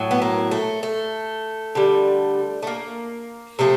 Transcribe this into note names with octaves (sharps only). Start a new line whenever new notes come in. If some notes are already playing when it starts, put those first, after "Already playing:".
Already playing: A2 F#3
B3
A#3
A3
A3
D3 G3
A3
A#3
C3 F3 A3